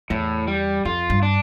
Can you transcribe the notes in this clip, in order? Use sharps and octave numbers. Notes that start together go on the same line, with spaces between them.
E2 A2
G3
F2 F4
G2
D4